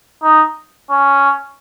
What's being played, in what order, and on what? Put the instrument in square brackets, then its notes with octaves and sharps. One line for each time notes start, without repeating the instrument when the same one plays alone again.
[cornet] D#4
C#4